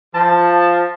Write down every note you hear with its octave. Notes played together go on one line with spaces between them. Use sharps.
F3 A5